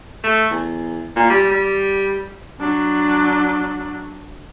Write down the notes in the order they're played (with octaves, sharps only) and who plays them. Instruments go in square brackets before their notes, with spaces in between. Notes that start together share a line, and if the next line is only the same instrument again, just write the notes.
[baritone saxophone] A3
E2
A#2
G3
G3
[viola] F#3 D4